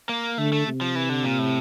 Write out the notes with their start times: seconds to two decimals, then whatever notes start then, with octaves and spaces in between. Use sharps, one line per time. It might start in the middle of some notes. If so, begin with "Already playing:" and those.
0.09 A#3
0.38 D3 A3
0.53 A3
0.67 C3
0.81 F3
0.95 E3
1.09 D3
1.24 A#2
1.39 A2